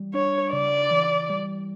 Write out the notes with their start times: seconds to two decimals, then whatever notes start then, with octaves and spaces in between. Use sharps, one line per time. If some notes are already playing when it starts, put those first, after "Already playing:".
Already playing: E3 G3
0.14 D4 C#5
0.53 C#3 D5
0.91 E3
1.29 G3